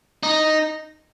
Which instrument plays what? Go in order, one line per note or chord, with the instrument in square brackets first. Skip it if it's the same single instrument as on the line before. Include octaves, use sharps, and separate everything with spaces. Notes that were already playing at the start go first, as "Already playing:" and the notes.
[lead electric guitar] D#4